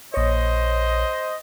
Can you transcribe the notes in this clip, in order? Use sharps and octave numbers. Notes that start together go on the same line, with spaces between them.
A#1 C5 C#5 D#5